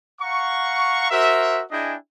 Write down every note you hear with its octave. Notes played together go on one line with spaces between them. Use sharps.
F5 F#5 A#5 C#6
F#4 A#4 C5 E5
D4 E4 G#4 D#5 G5 G#5